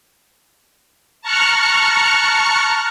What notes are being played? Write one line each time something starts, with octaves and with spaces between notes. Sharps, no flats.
A5 A#5 C#6 F6 F#6 C#7